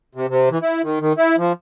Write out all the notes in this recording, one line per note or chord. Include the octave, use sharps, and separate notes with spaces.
C3
C3
E3
E4
D#3
D#3
E4
F3